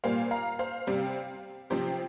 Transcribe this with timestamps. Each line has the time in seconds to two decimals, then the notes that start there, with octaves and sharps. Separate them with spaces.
0.04 A#2 G3 A#3 C5 F5
0.31 F5 A#5
0.59 C5 F5
0.87 C3 G3 C4
1.70 C3 F3 C4 G4 C5